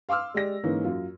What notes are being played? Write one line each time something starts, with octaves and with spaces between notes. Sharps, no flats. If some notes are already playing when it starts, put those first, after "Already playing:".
F5 C6 D6 E6 F6
G#3 G4 D5 A#6
G#2 E3 A#3 C#4
F#2 F4